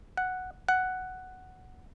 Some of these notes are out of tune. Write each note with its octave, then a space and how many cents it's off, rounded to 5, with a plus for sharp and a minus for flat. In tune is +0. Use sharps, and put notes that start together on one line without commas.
F#5 +0
F#5 +5